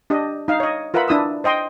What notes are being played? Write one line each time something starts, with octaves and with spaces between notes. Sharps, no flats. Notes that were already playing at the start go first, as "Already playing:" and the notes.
D4 G4 D#5
D#4 F5
C#5 D#5
F4 A#4 B4 E5 F#5 B5
D4 E4 D#6 E6
C5 D#5 G5 C6